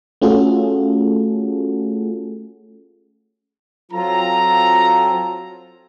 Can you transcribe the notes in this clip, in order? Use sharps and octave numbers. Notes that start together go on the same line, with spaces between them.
A3 C#4 F4 F#4 G#4 A4
F#3 C4 F4 A4 A#5